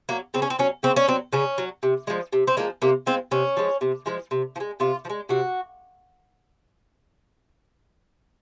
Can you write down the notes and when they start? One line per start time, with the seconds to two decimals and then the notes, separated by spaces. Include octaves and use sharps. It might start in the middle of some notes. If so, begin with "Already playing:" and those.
0.09 F#3 A#3
0.34 C#3 C4
0.42 C#4
0.50 C4
0.59 F#3 C#4
0.83 C#3 C4
0.96 C#4
1.08 F#3 C4
1.33 C#3 C#4
1.58 F#3
1.83 C3
2.07 F3 G#3
2.33 C3
2.47 C4
2.57 F3 G#3 A#3
2.82 C3 A#3
3.06 F3 G#3 C4
3.31 C3 C#4
3.57 F3 G#3
3.81 C3
4.06 F3 G#3
4.31 C3
4.56 F3
4.60 G#3
4.80 C3 F4
5.05 F3
5.10 G#3
5.29 C3 F#4